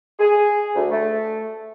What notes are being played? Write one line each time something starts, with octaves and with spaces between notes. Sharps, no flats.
G#4
D2
A3